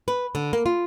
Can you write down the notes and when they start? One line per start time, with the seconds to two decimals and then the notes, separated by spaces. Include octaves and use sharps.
0.08 B4
0.35 D3
0.53 A#3
0.66 F4